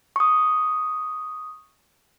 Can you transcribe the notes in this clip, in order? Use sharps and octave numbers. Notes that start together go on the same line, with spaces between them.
C#6 D#6